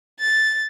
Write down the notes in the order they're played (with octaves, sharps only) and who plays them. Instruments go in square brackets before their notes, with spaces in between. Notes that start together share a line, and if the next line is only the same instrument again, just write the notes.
[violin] A6